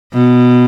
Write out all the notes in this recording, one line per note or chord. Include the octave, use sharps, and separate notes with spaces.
B2